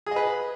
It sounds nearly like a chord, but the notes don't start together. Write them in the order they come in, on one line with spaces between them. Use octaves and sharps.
G#4 D#5 B4